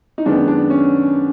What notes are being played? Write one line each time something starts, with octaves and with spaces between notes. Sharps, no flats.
D#4
F#2 D#3 G#3 B3 D4
D4
C#4